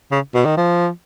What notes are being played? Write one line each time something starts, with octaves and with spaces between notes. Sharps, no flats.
C#3
B2
D#3
F3